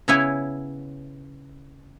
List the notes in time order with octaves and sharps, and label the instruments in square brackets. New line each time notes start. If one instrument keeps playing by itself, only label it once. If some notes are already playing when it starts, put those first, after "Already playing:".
[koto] C#3 B3 E4 C#5 G#5